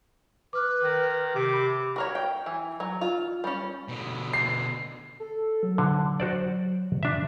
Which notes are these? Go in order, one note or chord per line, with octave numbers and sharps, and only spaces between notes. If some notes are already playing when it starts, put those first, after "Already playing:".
B4 D6 F6 F#6
D#3
C3 D6
B5
F#4 A#4 C#5
G5
E3
F#3
F4
G3 C#4
B2 D3
C7
A4
F#3
D3
F#4 C5 D5
D4 E5